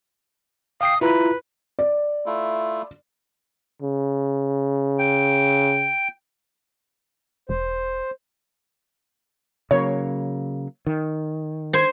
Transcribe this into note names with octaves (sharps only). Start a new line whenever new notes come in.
F5 G5 D#6 C7
E4 F4 B4 A#5
D5
A3 E4 F4
C#3
G5
E1 C5
C#3 F#3 A#3 C#5
D#3
C5 G#6